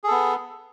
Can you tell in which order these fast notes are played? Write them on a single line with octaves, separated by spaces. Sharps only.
G#4 A4 B3